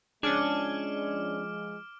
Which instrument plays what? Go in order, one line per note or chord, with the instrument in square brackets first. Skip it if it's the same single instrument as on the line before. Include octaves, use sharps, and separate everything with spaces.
[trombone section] F3 G#3 [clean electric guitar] C#4 G#4 [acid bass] D4 [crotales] D6 F6 D7